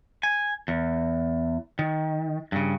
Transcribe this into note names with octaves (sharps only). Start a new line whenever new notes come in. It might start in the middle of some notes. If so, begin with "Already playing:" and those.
G#5
E2
D#3
G2 C#3